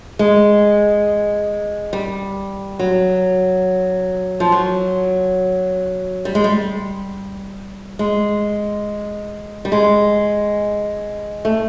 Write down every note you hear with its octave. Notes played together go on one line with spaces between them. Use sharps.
G#3
G3
F#3
F3
F#3
G3
G#3
G3
G#3
G3
G#3
A3